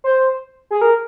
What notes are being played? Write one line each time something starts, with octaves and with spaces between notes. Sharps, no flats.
C5
G#4
A#4